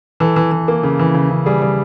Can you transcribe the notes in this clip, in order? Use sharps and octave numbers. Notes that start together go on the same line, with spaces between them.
E3 A4
E3
E3
A#3
C#3
E3
C#3
C#3
G3 G#4
G3